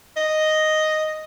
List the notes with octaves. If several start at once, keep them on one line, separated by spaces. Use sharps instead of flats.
D#5